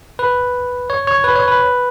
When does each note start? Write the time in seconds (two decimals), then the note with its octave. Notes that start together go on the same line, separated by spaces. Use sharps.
0.19 B4
0.90 C#5
1.07 C#5
1.24 B4
1.36 C#5
1.48 B4